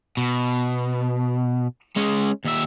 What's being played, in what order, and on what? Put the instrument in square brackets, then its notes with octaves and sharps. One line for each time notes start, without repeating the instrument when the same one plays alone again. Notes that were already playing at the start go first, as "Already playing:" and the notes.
[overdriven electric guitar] B2
G#3 C#4
D#2 E5